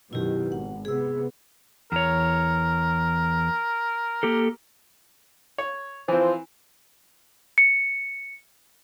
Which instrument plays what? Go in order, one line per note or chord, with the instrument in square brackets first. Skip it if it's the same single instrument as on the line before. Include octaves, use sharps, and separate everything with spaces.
[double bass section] F#2 B2 D#3 [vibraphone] E4 G4
[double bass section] G#1 [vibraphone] F#5
[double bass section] C3 B3 [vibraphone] G#4 E6
[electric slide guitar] E2 C#5 [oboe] A#4
[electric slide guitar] A#3 G4 A4
[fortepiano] C#5
[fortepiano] E3 C4 [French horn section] F3 F4 C5
[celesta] C#7